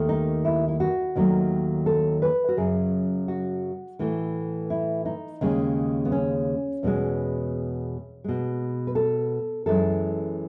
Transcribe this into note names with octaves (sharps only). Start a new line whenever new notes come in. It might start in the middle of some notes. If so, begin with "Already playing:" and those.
Already playing: D#2 D#3 A3
D#4
E4
E4
F#4
D#2 D#3 F#3 A3
A4
B4
F#4
F#2 C#3 F#3 G#4
F#4
A2 E3 A3
E4
D#4
D#2 C#3 G#3
B3
C#4
E2 B2 G#3
B2 G#3
B4
A4
F#2 E3 G#3 A4